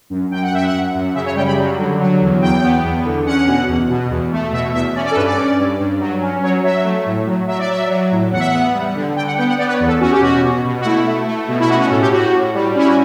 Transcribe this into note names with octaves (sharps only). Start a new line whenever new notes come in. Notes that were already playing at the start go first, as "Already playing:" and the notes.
F#2
F#2 G5
F#5
F#2 E5
F#5
F#2
F#2
C#3 E5
C#5
G3 G5
B5
F#3
D3
F#3
E2
E2 G5
B3
E2
D3
C#4 F#5
B2
E2
B2
E2
A3
B2 E5
E2 E5
C#4 D5
D5
A4
G2 B4
D5
C#4
G2
G2
F#3
C#4
F#3 C#5
F#3 E5
A3
A2
F#3
F#3 E5
D5
F#3 E5
F#3
A2
E2 F#5
E5
F#5
B3
G3
D3
D3 G5
F#5
B3 G5
F#5
B3 D5
B4
C#5
E2
A4
C#4 F#4
G4
B2 F#4
B2
B2
F#4
A3 E4
A3
A3
B2
E4
C#4 F#4
F#4
A2 A4
G4
A2 F#4
A2
G3
C#4 E4
F#4